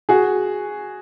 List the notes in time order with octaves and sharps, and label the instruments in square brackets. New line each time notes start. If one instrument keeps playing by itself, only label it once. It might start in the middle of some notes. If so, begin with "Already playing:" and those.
[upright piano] F#4 G#4